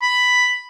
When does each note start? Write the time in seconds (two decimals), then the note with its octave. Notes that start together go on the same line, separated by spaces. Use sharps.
0.02 B5